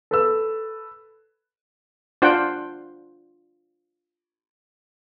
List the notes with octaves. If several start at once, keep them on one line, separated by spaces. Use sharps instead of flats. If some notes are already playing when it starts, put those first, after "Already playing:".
A4 B4 E6
D4 F4 C5 F#5 G5